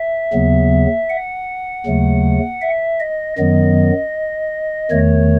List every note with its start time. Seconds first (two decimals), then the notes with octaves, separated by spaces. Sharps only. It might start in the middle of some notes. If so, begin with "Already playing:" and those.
Already playing: E5
0.33 D#2 C#3 F#3 B3
1.10 F#5
1.86 D#2 C#3 F#3 A3
2.61 E5
3.00 D#5
3.38 F#2 D#3 F#3 B3 D#5
4.91 E2 D#3 A3 C#5